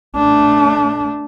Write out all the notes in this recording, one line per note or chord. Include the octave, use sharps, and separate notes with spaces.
A3 D4